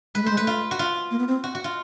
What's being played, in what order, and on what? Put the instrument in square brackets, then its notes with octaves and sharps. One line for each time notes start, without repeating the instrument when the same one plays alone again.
[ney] G#3 [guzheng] B4
[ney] A3
[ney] G#3 [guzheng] C5
[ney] A3 [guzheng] B4
[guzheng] F4
F#4
F4
[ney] A#3
B3
C4
[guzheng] F#4
F#4
F4